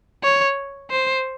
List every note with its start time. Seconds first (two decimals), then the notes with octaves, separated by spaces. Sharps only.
0.23 C#5
0.91 C5